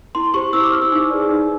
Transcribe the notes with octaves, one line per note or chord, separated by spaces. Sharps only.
E4 C6
G4 C5 C#6
E4 E6
D6
G4 C5 F6
E6
D#4
G#4 B4 D5
D#4